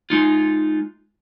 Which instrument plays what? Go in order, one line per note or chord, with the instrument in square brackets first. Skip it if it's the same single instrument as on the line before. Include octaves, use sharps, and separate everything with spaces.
[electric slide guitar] G#3 D#4 F4